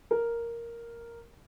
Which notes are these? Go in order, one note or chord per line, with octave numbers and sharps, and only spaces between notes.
A#4